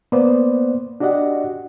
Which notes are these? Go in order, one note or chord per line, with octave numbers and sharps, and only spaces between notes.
A#3 B3 B4 C5 D5
D4 F#4 G4 D5 D#5 F#5